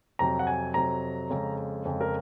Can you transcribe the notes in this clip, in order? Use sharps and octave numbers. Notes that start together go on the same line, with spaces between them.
F2 C3 F#3 A#5
F#5
G#5
F2 C3 F#3 A#5
F2 C#3 G#3 C#4
F2 C#3 G#3 C#4
A#4